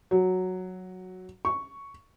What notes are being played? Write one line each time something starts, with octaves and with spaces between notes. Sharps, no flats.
F#3
C#6